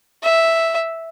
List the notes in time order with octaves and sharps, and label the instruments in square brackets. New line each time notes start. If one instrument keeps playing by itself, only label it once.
[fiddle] E5